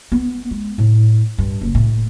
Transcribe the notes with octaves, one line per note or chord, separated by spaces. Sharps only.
B3
G#3
A2
G2
F#1
A2